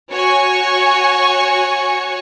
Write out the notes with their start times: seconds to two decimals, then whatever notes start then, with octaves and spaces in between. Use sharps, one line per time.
0.11 F#4 C#5 G#5 C#6